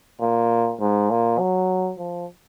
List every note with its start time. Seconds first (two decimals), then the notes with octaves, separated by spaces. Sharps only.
0.21 A#2
0.80 G#2
1.10 A#2
1.39 F#3
1.99 F3